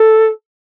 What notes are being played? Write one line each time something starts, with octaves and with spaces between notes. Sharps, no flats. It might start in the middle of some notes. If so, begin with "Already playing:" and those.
Already playing: A4